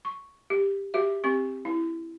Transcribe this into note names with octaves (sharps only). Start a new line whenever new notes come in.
C#6
G4
F#4 G4 E5
C4 G4 C#6
E4